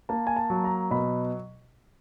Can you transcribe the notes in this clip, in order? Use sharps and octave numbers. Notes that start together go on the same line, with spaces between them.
A#3 A5
G#5
A5
F#3
A#5
B2 B5